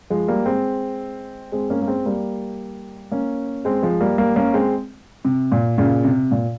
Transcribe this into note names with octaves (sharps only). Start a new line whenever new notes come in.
F3 G#3
G3 A#3
G#3 C4
G#3 C4
A#3 C#4
A#3
G#3 C4
G3 A#3
A#3 C#4
G#3 C4
F3 G#3
G3 A#3
G3 A#3
A#3 C#4
G#3 C4
C3
A#2
A#2 C#3
C3
A#2